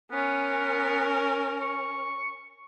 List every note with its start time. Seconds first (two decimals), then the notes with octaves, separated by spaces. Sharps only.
0.11 B3 C#4 A#4
1.60 C#6